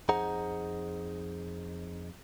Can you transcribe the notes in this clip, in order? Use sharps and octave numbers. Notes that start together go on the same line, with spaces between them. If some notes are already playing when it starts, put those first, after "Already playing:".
F2 D#4 G#4 C5 F#5 A#5